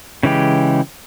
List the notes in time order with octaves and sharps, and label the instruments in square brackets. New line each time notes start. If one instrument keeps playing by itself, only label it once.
[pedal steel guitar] C#3 E3 G#3 G4